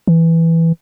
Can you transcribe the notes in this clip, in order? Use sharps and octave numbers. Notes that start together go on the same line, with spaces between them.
E3